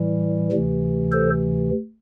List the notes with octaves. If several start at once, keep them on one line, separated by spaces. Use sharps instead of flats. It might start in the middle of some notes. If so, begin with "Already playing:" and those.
Already playing: A2 E3 G3
D2 C3 E3
A4 C5